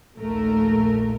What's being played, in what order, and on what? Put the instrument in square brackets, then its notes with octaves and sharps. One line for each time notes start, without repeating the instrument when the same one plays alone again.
[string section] A#1 D#2 A3 A#4